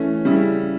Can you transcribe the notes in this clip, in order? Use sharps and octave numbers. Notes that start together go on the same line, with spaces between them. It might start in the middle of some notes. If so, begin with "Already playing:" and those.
Already playing: E3 A3 C#4
C#3 G3 C#4 E4